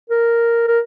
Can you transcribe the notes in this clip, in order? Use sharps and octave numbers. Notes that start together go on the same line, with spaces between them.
A#4
A#4